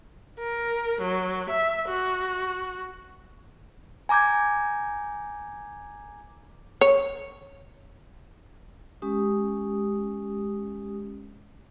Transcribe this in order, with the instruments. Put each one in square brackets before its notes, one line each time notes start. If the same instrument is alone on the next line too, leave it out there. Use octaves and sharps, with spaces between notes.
[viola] A#4
F#3
E5
F#4
[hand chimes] G#5 A#5 D6 G6 G#6
[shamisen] C#5
[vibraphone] G#3 C#4 G4 D#6